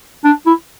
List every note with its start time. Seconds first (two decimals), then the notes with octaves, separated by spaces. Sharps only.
0.24 D4
0.46 E4